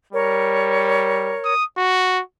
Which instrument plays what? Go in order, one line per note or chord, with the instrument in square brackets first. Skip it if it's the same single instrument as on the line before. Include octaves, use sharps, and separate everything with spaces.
[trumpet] G3 [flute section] A#4 C#5
[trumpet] D#6
F#4